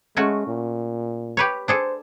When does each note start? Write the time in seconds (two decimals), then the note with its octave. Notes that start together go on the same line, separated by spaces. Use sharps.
0.17 G#3 A3 C#4 F#4
0.47 A#2
1.37 G4 B4 C#5
1.68 D4 G#4 A4 C5